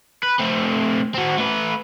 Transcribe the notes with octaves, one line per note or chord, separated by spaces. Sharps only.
B4
A3 C4
C4 F#4
A3 B4